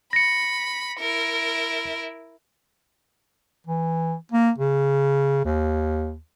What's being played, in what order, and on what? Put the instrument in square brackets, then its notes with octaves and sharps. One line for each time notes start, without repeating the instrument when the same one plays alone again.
[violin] B5 [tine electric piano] A#6 C#7
[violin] E4 A#4
[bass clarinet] E3
A#3
C#3
D#2